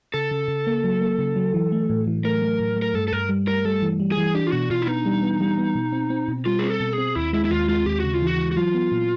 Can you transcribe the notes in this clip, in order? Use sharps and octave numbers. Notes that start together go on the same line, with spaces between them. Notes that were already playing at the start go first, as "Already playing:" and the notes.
C#3 A4
C#3
C#3
A#3
F#3
A#3
C#3
F#3
E3
A3
A2
E3
A3 A#4
A3
A2
A3
A#4
G2 A4
A4
G2 A#4
G3
G3 A#4
G3 A4
E3
G3
G#4
E3
D4 G4
F4
B2 F#4
B2 F4
E4
B3 D#4
G3
B3
G3
B3
B2
C4
C4
B2
G3 F4
C4 G#4
A4
B2
C4 G#4
D#2 E4
G#3 E4
E4
D#2 F4
G#3 F4
D#2 G4
C#3 F#4
F4
E3 F#4
E3
F#4
F#3 F4
B3
A#2